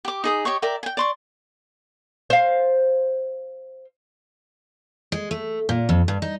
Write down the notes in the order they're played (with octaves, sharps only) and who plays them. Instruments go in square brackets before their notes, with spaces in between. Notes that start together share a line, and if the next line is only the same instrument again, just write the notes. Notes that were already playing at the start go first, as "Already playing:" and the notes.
[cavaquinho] G4 D6
D#4 G#4 D#6
G4 C#5 D#5 C#6
A#4 D5 E5 G5
G5 G#5
D5 C6 C#6
[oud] C5 F5
[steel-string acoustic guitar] G#3
A3
A#2
F2
G2
D#4